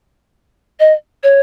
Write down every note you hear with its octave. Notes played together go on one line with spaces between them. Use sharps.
D#5
C#5